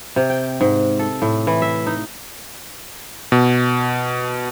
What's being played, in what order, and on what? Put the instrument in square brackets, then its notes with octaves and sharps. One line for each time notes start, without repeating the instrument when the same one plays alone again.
[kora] C3
G5
G#2
A4
A2
E3
E5
D#4
[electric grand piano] B2